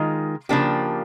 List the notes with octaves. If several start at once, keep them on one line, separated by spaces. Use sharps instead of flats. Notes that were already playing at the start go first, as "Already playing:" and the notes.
Already playing: D#3 G#3 F4
C#3 F3 A#3 D4 G4